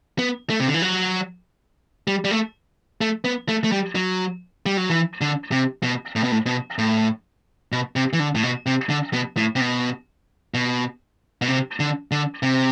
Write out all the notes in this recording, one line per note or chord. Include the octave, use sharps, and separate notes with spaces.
B3
A3
C3
D3
E3
F#3
G3
G3
A3
A3
B3
A3
A3
G3
F#3
G3
F#3
E3
D3
C3
B2
A2
B2
A2
B2
A2
B2
C3
E3
D3
A2
B2
C3
D3
B2
A2
C3
B2
B2
B2
C3
D3
D3
C3